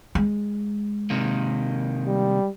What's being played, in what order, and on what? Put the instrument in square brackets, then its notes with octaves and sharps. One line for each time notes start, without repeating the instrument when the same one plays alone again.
[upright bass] G#3
[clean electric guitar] C3 D#3 A#3
[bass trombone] G3